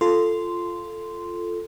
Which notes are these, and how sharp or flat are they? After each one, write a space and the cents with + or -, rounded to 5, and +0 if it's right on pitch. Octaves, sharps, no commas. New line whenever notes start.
F4 -5 A4 +0 C6 -10